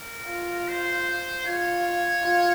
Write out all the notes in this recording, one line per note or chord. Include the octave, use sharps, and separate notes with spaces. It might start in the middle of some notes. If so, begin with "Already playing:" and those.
Already playing: A#4
F4
C5
F4 C#5
F4